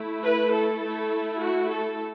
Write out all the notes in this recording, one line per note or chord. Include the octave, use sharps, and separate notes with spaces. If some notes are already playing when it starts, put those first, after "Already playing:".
Already playing: A3 E4
B4
A4
A3 E4
F#4
A4